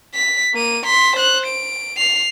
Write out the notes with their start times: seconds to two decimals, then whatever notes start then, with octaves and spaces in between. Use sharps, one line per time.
0.14 B6
0.53 A#3 D#7
0.86 C6 B6
1.16 C5 F#6
1.46 D7
1.97 C7 F7